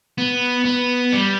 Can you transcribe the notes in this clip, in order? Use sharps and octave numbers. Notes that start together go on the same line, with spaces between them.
B3
B3
G3